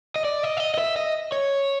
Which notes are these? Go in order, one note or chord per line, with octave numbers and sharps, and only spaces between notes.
D#5
D5
D#5
E5
D#5
D#5
E5
D#5
C#5